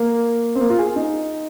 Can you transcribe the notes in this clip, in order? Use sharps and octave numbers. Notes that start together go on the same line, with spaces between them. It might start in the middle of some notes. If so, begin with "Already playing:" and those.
Already playing: A#3
C4
A#3
F4
G#4
D#4